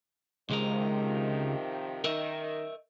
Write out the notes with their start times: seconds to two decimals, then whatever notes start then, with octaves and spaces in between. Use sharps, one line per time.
0.50 C#2 C3 D#3 F3 G#3 A#4
2.04 D#3 A#4 D#5 E5